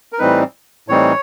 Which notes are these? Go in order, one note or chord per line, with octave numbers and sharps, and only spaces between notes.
A#4
A2 E3 G3 C4 D#4 B4
A2 E3 G3 C4 D#4 C#5